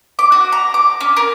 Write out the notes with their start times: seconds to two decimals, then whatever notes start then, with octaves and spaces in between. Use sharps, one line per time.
0.19 D6
0.32 F#4
0.52 A#5
0.74 D6
1.01 C#4
1.17 A#4